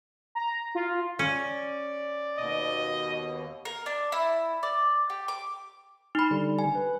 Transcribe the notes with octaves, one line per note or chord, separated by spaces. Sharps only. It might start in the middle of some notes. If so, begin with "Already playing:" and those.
A#5
F4
C#4 D5
D#2 B2 D#5
A#4
D4
E4
D5
G4
D6
D#4 B5 C6
D3 G3
G#5
B4